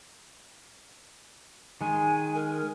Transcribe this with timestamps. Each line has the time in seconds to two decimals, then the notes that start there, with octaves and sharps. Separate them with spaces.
1.81 D#3 G#3 G#5
2.35 A#4